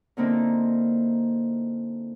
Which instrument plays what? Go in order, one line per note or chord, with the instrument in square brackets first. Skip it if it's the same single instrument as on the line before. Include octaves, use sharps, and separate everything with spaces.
[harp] A#2 D3 A#3 C4 D#4 E4